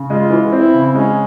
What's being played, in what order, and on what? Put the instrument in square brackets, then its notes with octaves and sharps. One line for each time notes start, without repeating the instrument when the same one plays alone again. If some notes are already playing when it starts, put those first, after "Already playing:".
Already playing: [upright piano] C#3
[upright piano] G#3 [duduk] F4
[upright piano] E3
[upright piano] C4 [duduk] E4
[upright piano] C#3
[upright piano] G#3 [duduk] C#4